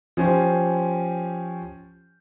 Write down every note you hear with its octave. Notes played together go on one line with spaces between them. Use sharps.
F3 C#4 G4 C5